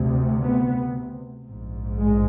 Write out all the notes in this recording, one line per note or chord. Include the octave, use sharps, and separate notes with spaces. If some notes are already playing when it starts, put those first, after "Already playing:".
Already playing: D2 C3
B3
A#1 G#2
G#3